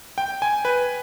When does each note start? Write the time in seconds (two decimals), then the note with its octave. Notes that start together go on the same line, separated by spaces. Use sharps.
0.18 G5
0.42 G#5
0.65 B4